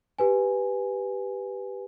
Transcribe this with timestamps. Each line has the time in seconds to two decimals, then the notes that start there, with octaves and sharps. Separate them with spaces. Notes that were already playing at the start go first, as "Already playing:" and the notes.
0.19 G4 B4 G#5